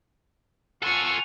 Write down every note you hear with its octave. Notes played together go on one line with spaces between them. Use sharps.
F4 A4 F#5 G#5 C#6